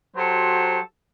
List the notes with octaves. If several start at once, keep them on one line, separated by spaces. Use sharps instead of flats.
F#3 F#4 G4 A4 C5